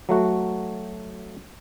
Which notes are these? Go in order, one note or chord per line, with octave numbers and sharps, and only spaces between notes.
F#3 A3 F#4